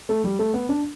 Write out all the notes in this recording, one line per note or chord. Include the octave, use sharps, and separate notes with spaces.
A3
G3
A3
B3
D4